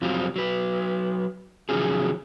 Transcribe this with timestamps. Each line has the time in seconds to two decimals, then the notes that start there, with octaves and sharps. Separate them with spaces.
0.01 F2 C3 F#3 G3 C4 F4
0.36 F#3 B4
1.69 C3 D#3 F3 F#3 C#4 G#4